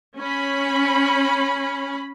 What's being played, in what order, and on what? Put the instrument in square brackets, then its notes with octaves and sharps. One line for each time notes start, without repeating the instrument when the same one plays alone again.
[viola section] C#4 B5